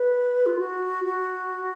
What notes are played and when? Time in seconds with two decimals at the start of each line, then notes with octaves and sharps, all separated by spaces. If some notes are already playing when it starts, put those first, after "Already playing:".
Already playing: B4
0.46 F4
0.59 F#4
1.05 F#4